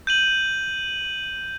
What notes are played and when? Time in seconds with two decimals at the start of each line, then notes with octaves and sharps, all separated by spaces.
0.07 G6 D#7 F#7